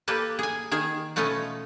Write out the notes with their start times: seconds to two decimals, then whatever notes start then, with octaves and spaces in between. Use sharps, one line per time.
0.08 A#3 G4 A4 B4
0.39 G#4 G#5
0.71 D#3 G#4 G#5
1.16 B2 A3 C#4 F4 D#5